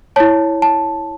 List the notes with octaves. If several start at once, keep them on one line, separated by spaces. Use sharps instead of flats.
E4 C#5 A5
A5